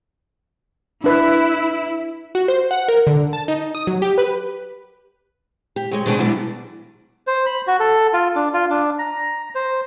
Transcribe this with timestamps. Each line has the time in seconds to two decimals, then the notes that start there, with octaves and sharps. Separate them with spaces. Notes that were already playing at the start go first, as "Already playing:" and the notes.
1.04 D4 E4 B4
2.35 F#4
2.48 C5
2.71 F#5
2.88 A#4
3.07 D3
3.33 A5
3.48 D#4
3.75 D#6
3.87 F#3
4.02 G4
4.18 B4
5.76 G4
5.91 F#3 G#3 C#5
6.06 B2 D#3 G#3 C4 D4 G#4
6.20 E3 F#3 G3 B3 D4 E4
7.27 C5
7.46 B5
7.67 F#4
7.80 A4
8.13 F4
8.36 D4
8.53 F4
8.70 D4
8.99 A#5
9.55 C5